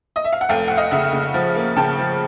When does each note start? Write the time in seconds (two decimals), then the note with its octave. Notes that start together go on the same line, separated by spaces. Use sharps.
0.16 D#5
0.24 E5
0.33 F5
0.41 F#5
0.49 F1 F5 G5
0.68 F1 F#5
0.77 D#5 F5
0.91 C#3 E5 F#5
1.13 C#3
1.34 F3
1.55 A#3
1.77 C#3 G5 A5
1.98 F3